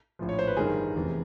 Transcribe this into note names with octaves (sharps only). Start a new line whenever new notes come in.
A#1 A2 F3
C#5
C5
B4
G1 G2 D#3 G#4 A#4
F1 E2 C3 E3